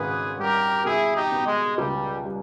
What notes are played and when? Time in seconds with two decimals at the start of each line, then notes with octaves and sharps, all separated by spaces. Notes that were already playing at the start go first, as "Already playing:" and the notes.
Already playing: G#1 G#2 C#4 G#4 B4
0.39 G3 G4 A#4
0.85 B2 E4 G#4
1.16 D#4 G4
1.32 B3
1.47 G#3
1.78 C#2 G3
2.24 G3